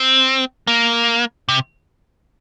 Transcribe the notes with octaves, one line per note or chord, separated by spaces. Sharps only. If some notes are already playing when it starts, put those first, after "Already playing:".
Already playing: C4
A#3
C3